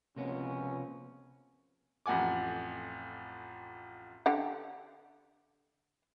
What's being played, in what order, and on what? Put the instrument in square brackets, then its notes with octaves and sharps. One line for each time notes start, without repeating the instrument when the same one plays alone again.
[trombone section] C#2 F3 C#4 [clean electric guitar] C3 A#3 B3
[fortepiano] A1 F2 F#5 G#5 D6
[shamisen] D3 G4 F#5